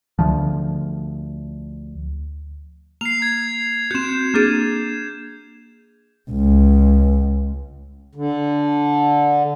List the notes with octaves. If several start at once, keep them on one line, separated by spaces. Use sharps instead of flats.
D2 F3
A#3 C7 F7
G#6
C4 F#4 G6 E7
A#3 D4 G#4
C#2
D3